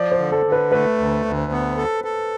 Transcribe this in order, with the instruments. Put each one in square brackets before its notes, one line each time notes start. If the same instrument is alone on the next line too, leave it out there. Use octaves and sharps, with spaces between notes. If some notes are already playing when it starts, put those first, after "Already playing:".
Already playing: [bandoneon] F3 [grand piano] D5
[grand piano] C5
[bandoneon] D3
[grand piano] A4
[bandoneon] D3
[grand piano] B4
[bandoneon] A3 [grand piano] B4
[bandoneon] D2
D2
B3
A4
A4